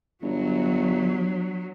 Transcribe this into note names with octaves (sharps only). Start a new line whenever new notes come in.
G1 F#3